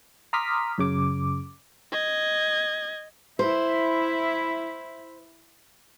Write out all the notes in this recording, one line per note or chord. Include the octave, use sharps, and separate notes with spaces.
A#5 C6 D6 D#6 F6 B6
F#2 C#3 D6
D#5 G#6
E4 C5